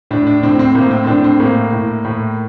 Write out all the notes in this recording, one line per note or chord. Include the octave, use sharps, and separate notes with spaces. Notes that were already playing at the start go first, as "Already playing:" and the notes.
A2 D4
D4
A2 C4
C4
A2 A#3
C4
C4
A2 D4
C4
A2 A#3
A2
A2